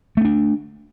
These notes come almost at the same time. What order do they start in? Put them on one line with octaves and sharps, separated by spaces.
A3 C#4 D4